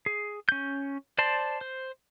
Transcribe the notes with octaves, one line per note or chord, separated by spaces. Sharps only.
G#4
C#4 G6
C5 D5 A5 C6
C5